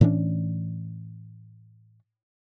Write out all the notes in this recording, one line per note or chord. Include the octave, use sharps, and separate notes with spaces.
A2 E3 C#4 D4